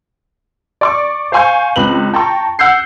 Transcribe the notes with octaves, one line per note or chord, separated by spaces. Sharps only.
D5 C#6 D6
C5 F5 G#5 C#6 G6
C#2 C4 B4 F#7
G5 A5 A#5 C#6
F#5 E6 G6 C7